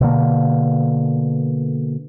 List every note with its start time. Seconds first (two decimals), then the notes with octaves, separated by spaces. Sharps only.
0.01 B2 D3 A#3